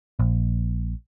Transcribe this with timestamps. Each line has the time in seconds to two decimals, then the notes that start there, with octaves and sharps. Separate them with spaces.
0.19 A#1